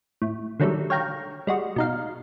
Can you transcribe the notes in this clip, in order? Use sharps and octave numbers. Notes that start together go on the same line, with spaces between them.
A2
D3 D#3 F#3 G3 A3
C#5 F5 G5 A#5
G3 G#3 F#4
B2 D#4 F5